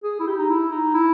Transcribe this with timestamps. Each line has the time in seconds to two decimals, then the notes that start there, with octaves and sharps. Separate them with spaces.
0.04 G#4
0.20 E4
0.27 G4
0.38 D#4
0.50 E4
0.71 D#4
0.94 E4